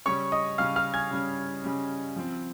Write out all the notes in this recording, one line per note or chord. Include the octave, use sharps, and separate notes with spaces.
C#3 G3 C#4 C#5 C#6
D#5 D#6
C#3 G3 C#4 F5 F6
F5 F6
G#5 G#6
C#3 G3 C#4
C#3 G3 C#4
F3 C4